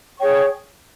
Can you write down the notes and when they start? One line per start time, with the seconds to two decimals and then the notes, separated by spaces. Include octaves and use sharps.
0.17 G#4 C#5 G5 C#6